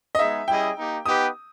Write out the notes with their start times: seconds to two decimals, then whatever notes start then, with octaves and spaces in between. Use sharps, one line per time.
0.15 D#5
0.19 G#3 B3 D#4 G#4 E5
0.48 G3 C#4 E4 G#4 D#5 G5
0.77 A#3 D#4 G4
1.06 B3 D#4 G4 B4 D#6